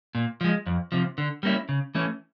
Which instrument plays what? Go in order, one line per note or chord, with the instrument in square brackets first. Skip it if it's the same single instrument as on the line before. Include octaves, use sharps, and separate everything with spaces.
[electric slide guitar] A#2
F3 G#3
F2
C3 F3
D3
G3 A#3 C#4 E4
C#3
E3 A3 C#4